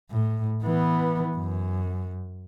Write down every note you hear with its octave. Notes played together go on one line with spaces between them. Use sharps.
A2
E3 B3
F#2